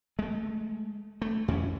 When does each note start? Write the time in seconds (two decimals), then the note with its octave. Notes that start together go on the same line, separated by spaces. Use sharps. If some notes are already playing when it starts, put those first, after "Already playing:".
0.19 G#3 A3
1.22 A3
1.48 F2 E3 B3 C#4